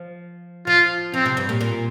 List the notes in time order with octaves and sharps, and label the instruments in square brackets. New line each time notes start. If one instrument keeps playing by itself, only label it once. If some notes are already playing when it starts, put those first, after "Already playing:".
Already playing: [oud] F3
[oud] F3 [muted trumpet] F4
[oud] F3 [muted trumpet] C4
[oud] C3
G2
A#2
A#2